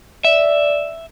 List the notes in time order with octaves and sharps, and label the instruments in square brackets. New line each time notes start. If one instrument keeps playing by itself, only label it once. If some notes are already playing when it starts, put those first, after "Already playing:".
[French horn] D5 [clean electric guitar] E5